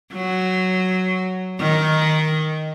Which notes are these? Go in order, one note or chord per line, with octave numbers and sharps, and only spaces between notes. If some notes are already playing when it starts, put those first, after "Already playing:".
F#3
D#3